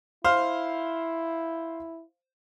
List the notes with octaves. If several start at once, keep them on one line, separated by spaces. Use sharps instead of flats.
E4 C5 F5